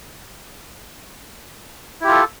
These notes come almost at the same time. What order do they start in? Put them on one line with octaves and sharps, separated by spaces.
E4 G4 F4 A4